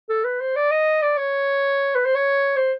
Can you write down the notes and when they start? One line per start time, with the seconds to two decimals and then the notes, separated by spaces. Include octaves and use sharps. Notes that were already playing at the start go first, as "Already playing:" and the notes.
0.09 A4
0.24 B4
0.41 C5
0.56 D5
0.71 D#5
1.02 D5
1.17 C#5
1.95 B4
2.05 C5
2.15 C#5
2.56 C5